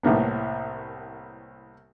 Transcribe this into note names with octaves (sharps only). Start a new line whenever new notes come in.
C2 A2 A#3 B3